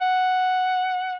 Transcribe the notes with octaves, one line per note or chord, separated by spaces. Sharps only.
F#5